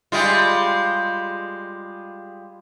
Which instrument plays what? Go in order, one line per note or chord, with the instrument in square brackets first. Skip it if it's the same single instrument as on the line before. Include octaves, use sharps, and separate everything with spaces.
[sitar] G3 G#3 F4